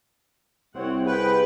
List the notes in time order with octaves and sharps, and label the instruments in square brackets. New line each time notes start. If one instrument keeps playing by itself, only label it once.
[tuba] C2 [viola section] C4 C#5 F#5
[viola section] G#4 F#5 G5 [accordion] B4